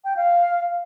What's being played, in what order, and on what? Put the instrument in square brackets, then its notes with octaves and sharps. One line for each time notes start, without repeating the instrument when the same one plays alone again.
[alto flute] G5
F5